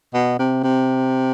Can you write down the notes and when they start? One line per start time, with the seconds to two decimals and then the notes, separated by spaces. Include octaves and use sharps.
0.14 B2
0.39 C3
0.64 C3